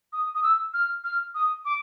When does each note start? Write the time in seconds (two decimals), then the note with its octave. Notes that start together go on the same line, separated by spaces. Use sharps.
0.13 D#6
0.35 D#6
0.43 E6
0.74 F6
1.04 F6
1.34 D#6
1.65 D6